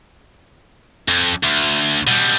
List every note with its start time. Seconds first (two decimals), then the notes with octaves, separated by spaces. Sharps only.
1.08 F2
1.43 D2
2.07 B2 G3